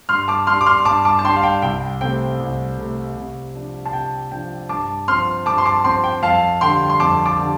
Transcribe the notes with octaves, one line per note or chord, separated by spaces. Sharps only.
G2 C6 F6
A5 D6
G3 D4 C6 F6
D6
C6 F6
G2 A5 D6
A5 D6
A5
G3 D4 G5 C6
F5
G5
C2 G5
C3 A3 C4 G5
C2
C3 A3 C4
C3
F3 D4
A5
C3 G5
F3 D4 G5
G2 A5 D6
F3 C4 C6 F6
G2 A5 D6
C6
A5 D6
F3 C4 G5 C6
G5
F2 F5 A5
D3 G3 G5 C6
C6
F2 A5 D6
A5 D6
D3 G3